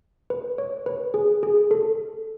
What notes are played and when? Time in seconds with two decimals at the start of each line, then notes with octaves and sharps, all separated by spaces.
0.30 B4
0.58 C#5
0.86 B4
1.14 G#4
1.43 G#4
1.71 A4